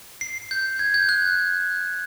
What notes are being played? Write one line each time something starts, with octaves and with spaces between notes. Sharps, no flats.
C7
G6
G#6
G6
F#6